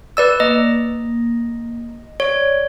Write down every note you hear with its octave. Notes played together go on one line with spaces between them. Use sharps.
B4 D5 E6
A#3 D#5
C#5 D5